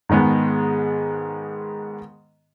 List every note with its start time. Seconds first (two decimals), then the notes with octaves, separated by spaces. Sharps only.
0.09 G#2 D#3 G#3 B3